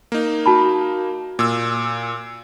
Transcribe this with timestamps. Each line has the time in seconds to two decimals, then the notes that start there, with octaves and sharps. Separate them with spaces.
0.12 A#3 D#4
0.46 F#4 A5 B5
1.39 A#2 E6